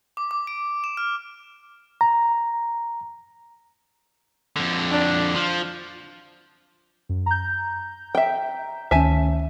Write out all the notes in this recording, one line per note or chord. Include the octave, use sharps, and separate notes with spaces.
D6
D6
D7
E7
F6
A#5
F2 D3
D4
F3
F#2
A#5 G6
E5 G5
D2 D#3 C#4 E5 G#5 A5